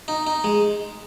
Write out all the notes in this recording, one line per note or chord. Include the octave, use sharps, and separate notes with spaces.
D#4
D#4
G#3